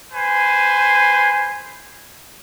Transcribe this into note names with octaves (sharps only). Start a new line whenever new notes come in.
B4 C5 G#5